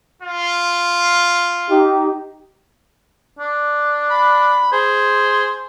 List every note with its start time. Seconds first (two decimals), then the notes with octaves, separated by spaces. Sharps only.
0.22 F4
1.70 D#4 G4
3.39 D4
4.10 B5
4.72 G#4 C5